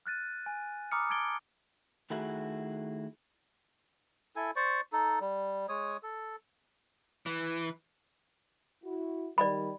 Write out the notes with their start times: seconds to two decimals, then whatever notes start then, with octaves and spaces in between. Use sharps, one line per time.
0.06 F6 F#6 A6 D#7
0.46 G#5
0.92 A#5 B5 D6 D#6 F6 C#7
1.09 A5 D6 G#6 A6 D7 G7
2.10 D#3 A3 E4 F#4 G#4
4.36 E4 A4 G#5
4.56 C5 D5 C#6
4.93 D#4 A4
5.20 G3
5.69 G#3 C#5 D#6
6.03 A4
7.26 E3
8.84 E4 F#4
9.38 D#3 G3 D5 D#5 B5